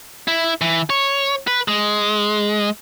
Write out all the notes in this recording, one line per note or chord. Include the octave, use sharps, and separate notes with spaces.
E4
E3
C#5
B4
G#3